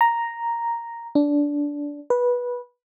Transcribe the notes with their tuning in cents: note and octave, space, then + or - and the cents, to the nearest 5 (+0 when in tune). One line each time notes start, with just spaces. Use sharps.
A#5 +0
D4 -15
B4 -15